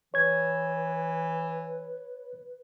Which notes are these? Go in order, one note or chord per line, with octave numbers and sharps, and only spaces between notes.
E3 B4 C#5 G#6